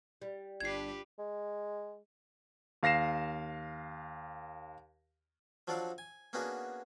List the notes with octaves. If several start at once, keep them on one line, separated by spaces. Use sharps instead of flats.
G3
G1 D4 F4 G4 B4 G#6 C7
G#3
D#2 F5 A#6 C7 E7
F3 F#3 D4 A4 D5 F5
G#5
A#3 B3 C#4 D4 F#4 G#4